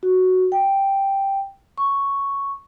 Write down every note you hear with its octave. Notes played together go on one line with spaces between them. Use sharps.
F#4
G5
C#6